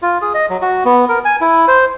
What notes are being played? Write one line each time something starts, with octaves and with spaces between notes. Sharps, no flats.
F4
G#4
D#5
F#3
F#4
B3
A#4
G#5
E4
C5